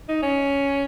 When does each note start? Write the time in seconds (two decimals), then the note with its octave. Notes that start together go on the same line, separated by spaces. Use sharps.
0.08 D#4
0.23 C#4